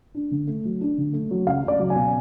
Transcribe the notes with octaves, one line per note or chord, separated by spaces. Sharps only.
D4
D3
A3
F#3
D4
D3
A3
F#3
C#2 F5
C#2 D5
F#3
G#5
B2